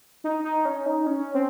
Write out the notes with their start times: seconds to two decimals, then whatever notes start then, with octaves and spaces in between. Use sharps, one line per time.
0.24 D#4
0.44 D#4
0.65 C#4
0.86 D#4
1.07 C#4
1.34 C4